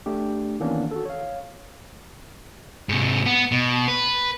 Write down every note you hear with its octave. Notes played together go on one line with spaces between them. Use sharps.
A3 D4 G4
D#3 E3 A#3 B3 C#4 D4
F#4 A4
C#5 F5
G#2 C3
B3
B2
B4